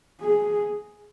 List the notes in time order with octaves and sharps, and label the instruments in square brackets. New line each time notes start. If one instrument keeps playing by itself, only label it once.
[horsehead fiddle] G#4